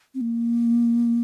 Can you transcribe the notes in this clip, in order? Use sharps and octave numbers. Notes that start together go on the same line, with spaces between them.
C4
A#3